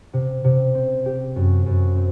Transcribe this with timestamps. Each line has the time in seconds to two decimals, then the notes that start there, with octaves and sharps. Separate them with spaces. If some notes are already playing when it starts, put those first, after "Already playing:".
0.13 C3
0.44 C3
0.75 C4
1.06 G4
1.36 F#2
1.66 F#2
1.96 C4